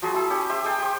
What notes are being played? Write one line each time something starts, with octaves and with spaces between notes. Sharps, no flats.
F3 F#3 F#4 G#4
E4 G#4
C#4 G4 C#5
G4 C5 E5
G#4 G5 A5
G4 C5